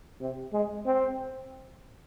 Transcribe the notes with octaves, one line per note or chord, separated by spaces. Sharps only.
C3
G#3
C4